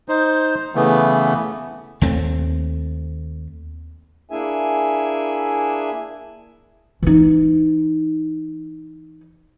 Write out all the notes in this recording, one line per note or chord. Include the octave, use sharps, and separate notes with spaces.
D#4 C5
C#3 E3 A3 B3
D#2 A3 C4
A#3 D4 E4 G#4 E5 G#5
E3 D#4